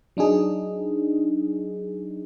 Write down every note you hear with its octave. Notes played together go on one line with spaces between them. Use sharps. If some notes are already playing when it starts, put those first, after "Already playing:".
F#3 D4 D#4 G#4